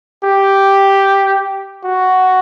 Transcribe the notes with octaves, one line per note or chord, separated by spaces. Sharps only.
G4
F#4